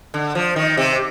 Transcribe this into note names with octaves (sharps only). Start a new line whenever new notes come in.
D3
F3
D#3
C3